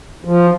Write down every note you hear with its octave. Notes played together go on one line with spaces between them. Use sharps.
F3